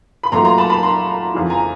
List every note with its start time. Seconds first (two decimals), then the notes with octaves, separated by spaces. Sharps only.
0.23 B5
0.32 A#2 F#3 A3 A#5 C6
0.45 A#5 C6
0.58 A5 B5
0.70 A5 B5
0.83 A#5 C6
1.33 F2 C#3 E3
1.50 G#5 A#5